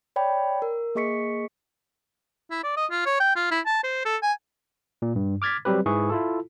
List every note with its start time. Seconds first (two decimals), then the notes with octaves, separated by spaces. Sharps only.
0.16 C#5 D5 G5 B5
0.62 A#4
0.95 A#3 G#4 D#5 C#6 B6 C#7
2.50 E4
2.63 D5
2.77 D#5
2.91 F4
3.06 C#5
3.20 G5
3.36 F4
3.51 E4
3.66 A5
3.83 C5
4.05 A4
4.22 G#5
5.02 A#2
5.16 G2
5.42 D6 F6 G#6 A6 B6
5.65 F#3 G3 C4 G4 B4
5.86 G#2 E4 G#4 B4 C#6
6.10 E4 F4 A4